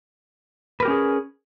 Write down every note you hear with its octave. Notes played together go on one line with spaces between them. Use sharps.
C#4 G4 G#4 A#4 B4